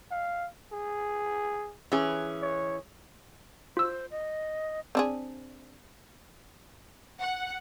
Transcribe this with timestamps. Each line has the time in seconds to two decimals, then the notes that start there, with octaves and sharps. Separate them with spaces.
0.11 F5
0.72 G#4
1.92 E3 C#4 G#4
2.42 C#5
3.77 F4 C5 E6
4.11 D#5
4.95 C4 D4 G#4
7.21 F#5